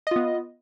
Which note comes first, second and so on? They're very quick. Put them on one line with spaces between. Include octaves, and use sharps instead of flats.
D#5 F4 B3